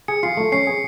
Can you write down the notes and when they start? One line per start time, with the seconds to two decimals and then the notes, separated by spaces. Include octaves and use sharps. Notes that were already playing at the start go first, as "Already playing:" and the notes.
0.08 G#4 C#7
0.23 F4 C7
0.37 A3
0.52 C#4 C7
0.67 G#4